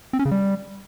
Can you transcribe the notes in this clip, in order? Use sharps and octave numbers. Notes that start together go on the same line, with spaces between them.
C4
C#4
C#3
G3